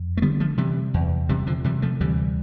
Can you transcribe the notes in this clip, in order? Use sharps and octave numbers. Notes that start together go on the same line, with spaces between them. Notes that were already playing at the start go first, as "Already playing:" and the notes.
Already playing: F2
A3
D3 G3 B3
F3 A3
C3 E3 G3
E2
C3 E3 G3
D3 F3
C3 E3 G3
F3 A3
D2 E3 G3